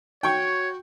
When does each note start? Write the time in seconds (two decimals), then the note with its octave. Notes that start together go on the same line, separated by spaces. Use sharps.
0.23 F#4 C#5 G5 C#6